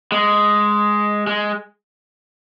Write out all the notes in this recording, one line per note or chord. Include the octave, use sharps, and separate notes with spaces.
G#3
G#3